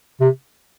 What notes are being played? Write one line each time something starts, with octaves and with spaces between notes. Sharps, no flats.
C3